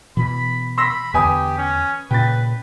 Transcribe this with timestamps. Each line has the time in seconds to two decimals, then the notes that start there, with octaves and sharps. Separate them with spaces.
0.17 B2 E3 B5
0.78 B5 C6 E6 A#6
1.14 E2 D3 G4 B4 G#5 D#6
1.57 C#4
2.11 A#2 C#3 B4 G5 A6